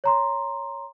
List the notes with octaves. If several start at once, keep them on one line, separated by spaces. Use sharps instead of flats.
C#5 A#5 C6